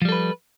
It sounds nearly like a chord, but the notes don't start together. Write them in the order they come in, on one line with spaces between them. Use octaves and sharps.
F3 G3 A4 B4